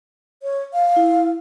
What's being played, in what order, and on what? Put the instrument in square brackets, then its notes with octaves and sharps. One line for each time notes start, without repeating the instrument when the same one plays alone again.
[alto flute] C#5
F5
[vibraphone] E4